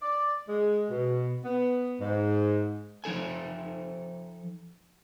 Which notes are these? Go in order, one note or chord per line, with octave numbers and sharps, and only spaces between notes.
D5
G#3
B2
B3
G#2
F3 D#4 A4 G#5